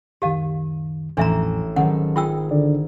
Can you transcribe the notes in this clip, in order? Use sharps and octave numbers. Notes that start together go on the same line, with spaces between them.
C#2 F#2 D#3 G4 F5 D#7
A1 E2 A2 F3 D4 E5 A#5
G#1 D#3 F#3 C#4 A4 F#5
F4 G#4 G5 E6
D3 D5